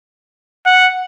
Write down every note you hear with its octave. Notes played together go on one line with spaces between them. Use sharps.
F#5